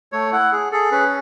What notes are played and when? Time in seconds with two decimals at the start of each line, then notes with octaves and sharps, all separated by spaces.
0.12 A3 C#5
0.32 E4 F#5
0.52 G#4
0.72 G#4 A4
0.92 C#4 B4